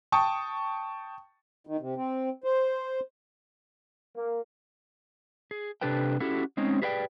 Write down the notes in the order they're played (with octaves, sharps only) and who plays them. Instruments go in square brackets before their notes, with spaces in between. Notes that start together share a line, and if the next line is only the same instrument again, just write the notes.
[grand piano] G5 A5 C#6 D#6
[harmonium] D#3
C3
C4
C5
[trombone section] A#3
[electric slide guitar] G#4
C3 D4 G4 A4 B4 G5
C#4 E4 F#4 G4 A4
G#3 C4 C#4 D#4
G4 G#4 B4 D5 D#5 G5